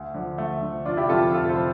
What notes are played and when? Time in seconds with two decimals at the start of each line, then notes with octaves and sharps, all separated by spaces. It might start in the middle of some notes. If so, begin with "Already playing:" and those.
Already playing: D2
0.14 D3 F3
0.38 D2 A3
0.62 D3 F3
0.85 F1 D4 F4
0.97 E4 G4
1.09 F2 D3 F3 F4 A4
1.33 F1 F4 A4
1.49 A4 C5
1.57 F3